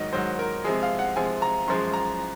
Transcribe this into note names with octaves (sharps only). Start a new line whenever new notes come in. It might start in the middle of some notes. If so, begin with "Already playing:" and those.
Already playing: G#2 D#3 F#3 D#5
G#2 D#3 F#3 C5
A#4
C3 F3 G#3 G#4
F5
F#5
C3 F3 G#3 G#5
A#5
F#2 F3 G#3 C6
A#5